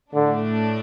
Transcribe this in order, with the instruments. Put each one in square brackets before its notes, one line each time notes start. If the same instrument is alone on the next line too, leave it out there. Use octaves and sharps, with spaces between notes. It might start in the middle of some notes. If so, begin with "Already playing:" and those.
[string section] A2 A3 D4 [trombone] D3